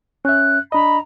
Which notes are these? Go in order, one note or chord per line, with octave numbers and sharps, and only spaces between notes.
C#4 E5 F#6
D4 D#5 A#5 B5